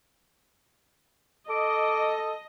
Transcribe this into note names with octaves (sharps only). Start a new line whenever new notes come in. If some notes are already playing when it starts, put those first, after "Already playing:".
A4 D#5 D6